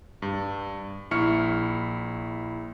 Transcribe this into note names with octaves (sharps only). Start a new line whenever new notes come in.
G2
A#1 E4 C#6 F6 C#7